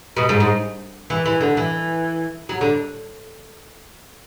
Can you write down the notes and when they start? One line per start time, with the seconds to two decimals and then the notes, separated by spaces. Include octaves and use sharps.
0.17 B2
0.29 G#2
0.40 G#2
1.10 E3
1.26 E3
1.41 D3
1.57 E3
2.49 F#3
2.61 D3